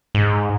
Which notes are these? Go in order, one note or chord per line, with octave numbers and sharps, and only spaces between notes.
G#2